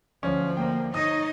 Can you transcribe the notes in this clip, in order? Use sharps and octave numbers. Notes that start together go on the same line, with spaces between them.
D2 F3 C#4
A#3 G5
D#4 C#5 D#5 D#6